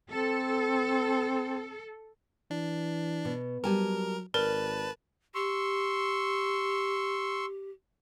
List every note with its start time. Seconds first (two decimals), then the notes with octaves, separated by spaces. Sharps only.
0.10 C4 A4
2.51 E3 D4
3.25 B2
3.64 F#3 G3 A#4 G#5 A5
4.34 G#1 A#4 B4 D5 A5
5.35 G4 C6 C#6 E6